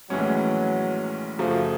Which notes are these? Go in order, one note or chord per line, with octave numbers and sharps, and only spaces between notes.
A#1 A2 E3 F#3 G#3 C#4
F#2 C#3 F3 F#3 A3